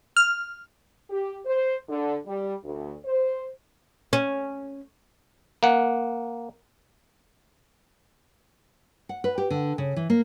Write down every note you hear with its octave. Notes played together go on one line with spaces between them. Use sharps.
F6
G4
C5
D3
G3
D2
C5
C#4
A#3 F#5
F#5
B4
G4
D3
C#3
E3
A#3